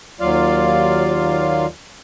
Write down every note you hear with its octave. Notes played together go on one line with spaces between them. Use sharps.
D#2 F#3 F4 D5 F5